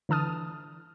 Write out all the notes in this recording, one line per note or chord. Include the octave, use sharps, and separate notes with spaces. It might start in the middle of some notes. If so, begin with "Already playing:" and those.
D3 E3 A5 D#6 F6